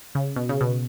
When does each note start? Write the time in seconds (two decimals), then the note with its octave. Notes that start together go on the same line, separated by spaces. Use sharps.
0.15 C#3
0.36 B2
0.49 C#3
0.61 B2